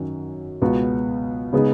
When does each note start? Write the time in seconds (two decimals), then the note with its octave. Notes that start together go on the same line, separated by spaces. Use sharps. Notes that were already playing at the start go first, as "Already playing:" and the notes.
Already playing: F#2 D#3 F#3 C#4 F#4
0.62 C#2 B2 B3 F#4
1.53 C#3 G#3 B3 D#4 G#4